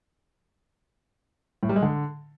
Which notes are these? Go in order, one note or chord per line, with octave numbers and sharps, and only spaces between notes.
A2
G3
G#3
D3